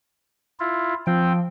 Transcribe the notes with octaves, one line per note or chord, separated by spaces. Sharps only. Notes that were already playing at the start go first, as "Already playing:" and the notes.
E4 F4
F3 C4 G5